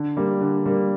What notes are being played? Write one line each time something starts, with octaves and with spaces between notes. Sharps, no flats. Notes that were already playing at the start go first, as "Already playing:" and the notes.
Already playing: D3
G3 A#3
D3
G3 A#3